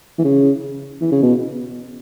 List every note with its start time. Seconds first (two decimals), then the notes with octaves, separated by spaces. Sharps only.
0.19 E3
0.25 C#3
1.01 E3
1.12 C#3
1.22 B2